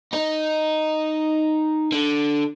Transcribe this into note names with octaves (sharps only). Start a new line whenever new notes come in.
D#4
D3